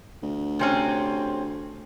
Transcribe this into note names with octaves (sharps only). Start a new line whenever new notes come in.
D2
C3 C4 C#4